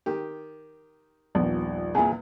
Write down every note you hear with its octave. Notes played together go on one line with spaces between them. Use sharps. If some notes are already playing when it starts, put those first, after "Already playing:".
D#3 G4
D#1 A#1 B3
E2 A#2 E4 G#4